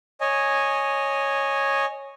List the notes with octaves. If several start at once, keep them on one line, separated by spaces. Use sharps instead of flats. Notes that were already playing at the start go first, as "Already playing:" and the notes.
C#5 D#5 G#5